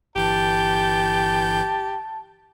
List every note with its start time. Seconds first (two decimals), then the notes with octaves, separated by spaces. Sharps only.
0.16 G1 E3 G4 A5 G6